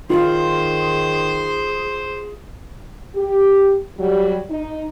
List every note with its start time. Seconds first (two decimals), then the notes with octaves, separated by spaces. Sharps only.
0.10 D#3 F4 G#4 C5
3.16 G4
3.99 F#3 G3
4.50 D#4